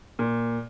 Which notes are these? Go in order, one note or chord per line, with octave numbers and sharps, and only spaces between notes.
A#2